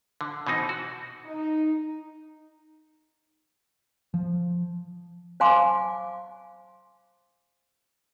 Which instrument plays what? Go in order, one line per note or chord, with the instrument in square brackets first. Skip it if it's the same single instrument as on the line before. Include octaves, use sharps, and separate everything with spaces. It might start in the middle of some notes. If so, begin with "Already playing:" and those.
[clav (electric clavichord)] D3
B2 E3 C4 D#4
F#4
[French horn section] D#4
[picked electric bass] F3
[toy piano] C5 F5 G#5 C6 D6